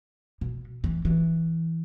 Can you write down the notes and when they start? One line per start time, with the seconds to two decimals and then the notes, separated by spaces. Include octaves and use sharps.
0.41 B2
0.84 E3
1.05 E3